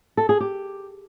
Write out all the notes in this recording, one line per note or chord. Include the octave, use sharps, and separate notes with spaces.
A4
G#4
G4